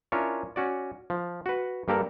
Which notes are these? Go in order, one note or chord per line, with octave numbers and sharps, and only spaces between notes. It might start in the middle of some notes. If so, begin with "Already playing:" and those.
C#4 D4 E4 F4 A#4 C#5
C#4 F#4 D5
F3
F#4 B4
G2 A#3 G4 A4 A#4 D5